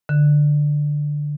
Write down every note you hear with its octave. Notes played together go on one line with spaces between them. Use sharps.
D3